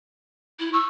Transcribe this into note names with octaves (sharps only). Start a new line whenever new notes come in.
E4
C#6 E6